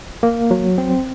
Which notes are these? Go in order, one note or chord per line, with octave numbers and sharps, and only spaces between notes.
A#3
F#3
C4